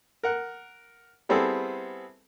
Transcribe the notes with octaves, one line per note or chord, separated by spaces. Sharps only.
A#4 F#5
G3 B3 C4 E4 G#4 A4